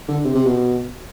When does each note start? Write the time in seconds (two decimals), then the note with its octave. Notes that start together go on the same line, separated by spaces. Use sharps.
0.08 D3
0.24 C3
0.35 C3
0.45 B2